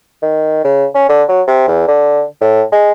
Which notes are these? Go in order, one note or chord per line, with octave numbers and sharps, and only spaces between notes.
D#3
C#3
C#4
D3
F#3
C3
E2
D3
A2
G#3